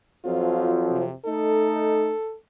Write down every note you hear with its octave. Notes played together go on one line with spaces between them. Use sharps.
F2 F3 F#3 F4
C3
A3 D#4 A4